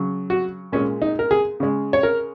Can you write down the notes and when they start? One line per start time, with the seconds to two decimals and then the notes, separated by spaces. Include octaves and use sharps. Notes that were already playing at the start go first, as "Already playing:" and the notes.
Already playing: C#3 F#3
0.30 F#4
0.72 A#2 G#3 C#4
1.02 D#4
1.19 A#4
1.31 G#4
1.60 C#3 G#3
1.93 C#5
2.03 A#4